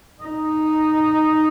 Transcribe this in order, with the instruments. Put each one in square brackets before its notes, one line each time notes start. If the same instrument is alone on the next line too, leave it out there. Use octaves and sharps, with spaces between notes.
[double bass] D#4